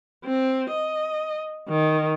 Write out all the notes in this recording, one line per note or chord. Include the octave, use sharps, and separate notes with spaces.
C4
D#5
D#3